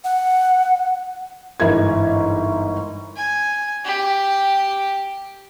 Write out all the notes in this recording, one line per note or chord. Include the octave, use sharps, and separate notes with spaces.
F#5
G1 G#2 E3 E4 A#4 G#6
G#5
G4